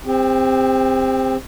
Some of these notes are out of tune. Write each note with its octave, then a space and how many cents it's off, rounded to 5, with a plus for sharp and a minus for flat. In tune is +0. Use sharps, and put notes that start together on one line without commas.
C4 +0 G4 +40